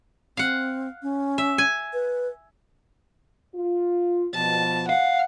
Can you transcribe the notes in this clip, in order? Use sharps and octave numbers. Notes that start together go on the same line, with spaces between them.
C4 F5 F#5
C#4
E5
G#5
B4
F4
B2 F3 A5
F5 F#5